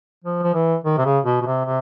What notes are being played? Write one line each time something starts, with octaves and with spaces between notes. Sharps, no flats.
F3
F3
E3
D#3
C3
C#3
B2
B2
C3
C3